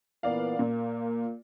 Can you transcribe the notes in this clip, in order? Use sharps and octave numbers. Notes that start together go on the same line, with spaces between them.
A#2 E3 B3 A#4 D5 F5
A#2 A#3